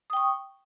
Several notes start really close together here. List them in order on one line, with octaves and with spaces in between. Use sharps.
D#6 G5 C#6